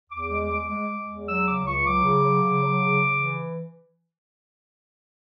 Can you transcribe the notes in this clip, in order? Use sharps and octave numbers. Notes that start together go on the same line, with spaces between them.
E2 D6
G#3
G#3
G#3
G#3
E2
F#3 E6
C#3 D6
C#2 C#6
F#3 D6
C#3
F#3
C#3
F#3
C#3
C#3
E3